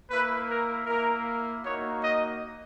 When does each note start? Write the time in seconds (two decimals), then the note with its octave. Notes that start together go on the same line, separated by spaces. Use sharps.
0.10 A#3 E4 B4
0.48 A#4
0.86 A#3 E4 A#4
1.63 A#3 D#4 F#4 C#5
2.01 D#5